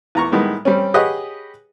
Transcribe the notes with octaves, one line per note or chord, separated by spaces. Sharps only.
E2 A#5 C#6
A2 D#3 G3 G#3 B3
G3 C4 C#4
G4 G#4 B4 C#5 D#5 F#5